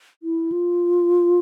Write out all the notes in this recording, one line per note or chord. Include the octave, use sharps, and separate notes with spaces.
E4
F4